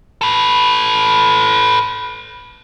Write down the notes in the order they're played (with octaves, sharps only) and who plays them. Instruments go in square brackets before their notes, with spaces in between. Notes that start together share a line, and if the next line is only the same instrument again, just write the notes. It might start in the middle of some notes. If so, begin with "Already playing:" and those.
[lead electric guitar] A4 B4